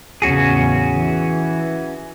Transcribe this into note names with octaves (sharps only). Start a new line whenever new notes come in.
E2 A2 C#3 C#4 F#4 G#4
E3